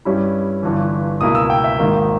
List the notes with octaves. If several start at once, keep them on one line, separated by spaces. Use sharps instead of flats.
G2 G3 C#4 E4
G1 G2 E3
C#2 B2 A#3 E4 D#6
E6
G5
E5
G#1 G#2 D#3 A#3